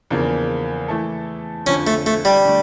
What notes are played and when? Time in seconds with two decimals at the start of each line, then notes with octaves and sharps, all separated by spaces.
0.10 E2 C#3 F3 A#3 D4
0.88 E3 A3 E4 A4
1.67 F2 D3 F3 C#4
1.87 A3
2.06 A3
2.25 G3
2.45 D3 A3